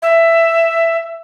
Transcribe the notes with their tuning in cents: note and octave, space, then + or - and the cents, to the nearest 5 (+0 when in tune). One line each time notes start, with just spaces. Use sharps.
E5 +10